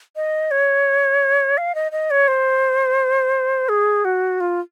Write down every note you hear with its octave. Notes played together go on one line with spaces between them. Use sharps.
D#5
C#5
F5
D#5
D#5
C#5
C5
G#4
F#4
F4